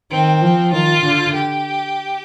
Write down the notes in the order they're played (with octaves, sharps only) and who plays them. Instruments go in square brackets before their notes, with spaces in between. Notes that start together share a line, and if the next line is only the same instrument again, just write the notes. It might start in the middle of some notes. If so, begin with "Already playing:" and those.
[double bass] D#3 [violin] C4
[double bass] F3
[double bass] D#3 [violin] F4
[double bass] D3
[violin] G4